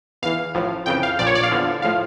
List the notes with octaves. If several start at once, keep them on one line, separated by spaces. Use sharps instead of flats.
E2 E3 F5
A1 A2 F3
F2 C#3 E3 G5
F5
A#1 A#2 F3 D5
C#5
D5
F5
E2 D3 F3
A2 F3 F5